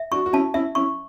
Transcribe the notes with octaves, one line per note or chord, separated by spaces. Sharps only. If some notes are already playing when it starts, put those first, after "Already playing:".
Already playing: E5
D4 F#4 C#6
F#4
C#4 E4 A5
C#4 E4 E5
C#4 E4 C#6